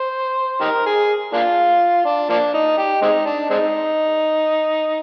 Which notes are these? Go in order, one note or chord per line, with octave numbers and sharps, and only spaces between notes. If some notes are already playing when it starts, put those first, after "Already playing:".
Already playing: C5
D#4 G4 A#4
G#4
A#3 D4 F4
D4
F3 A#3 D4
D#4
G4
G#3 C4 D#4
D4
G#3 C4 D#4